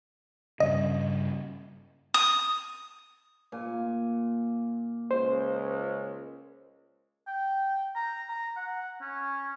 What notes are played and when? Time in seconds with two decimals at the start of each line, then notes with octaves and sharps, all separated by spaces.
0.60 G2 C#3 D#5
2.14 D#6
3.52 A#2 G#5
5.11 C#2 C5
7.27 G5
7.95 A#5
8.29 A#5
8.57 F#5
9.01 C#4